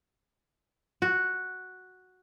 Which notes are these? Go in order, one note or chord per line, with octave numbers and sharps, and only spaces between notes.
F#4